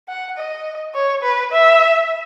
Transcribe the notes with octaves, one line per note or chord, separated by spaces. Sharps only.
F#5
D#5
C#5
B4
E5